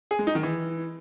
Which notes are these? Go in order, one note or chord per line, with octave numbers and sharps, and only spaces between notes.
G#4
G#3
D#4
D#3
E3